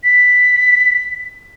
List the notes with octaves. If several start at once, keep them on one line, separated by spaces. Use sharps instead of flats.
B6